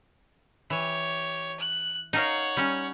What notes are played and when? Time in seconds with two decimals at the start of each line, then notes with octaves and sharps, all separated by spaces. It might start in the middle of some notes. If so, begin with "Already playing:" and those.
0.70 E3 G4 C#5
1.60 F#6
2.13 D#4 A#4 C#5 F5 F#5
2.57 G3 C#4